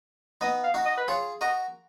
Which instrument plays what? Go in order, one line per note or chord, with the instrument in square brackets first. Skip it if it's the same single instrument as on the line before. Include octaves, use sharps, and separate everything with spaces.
[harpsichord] B3 D#4 [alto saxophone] D#5
[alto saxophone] F5
[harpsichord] D#4 F#4
[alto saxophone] D#5
B4
[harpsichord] F4 G#4 [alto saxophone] C#5
[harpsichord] F#4 A#4 [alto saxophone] D#5